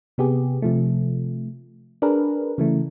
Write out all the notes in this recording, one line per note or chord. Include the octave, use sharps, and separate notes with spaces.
C3 B3 G4 G#4
C3 F3 A3
D4 G#4 A#4 B4
C#3 E3 A3